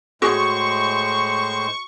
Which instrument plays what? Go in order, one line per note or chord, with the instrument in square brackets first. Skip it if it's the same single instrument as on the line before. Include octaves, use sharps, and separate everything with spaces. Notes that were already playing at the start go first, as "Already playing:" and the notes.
[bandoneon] A2 G#3 C5 [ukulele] F#4 G#4 [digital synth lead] C#6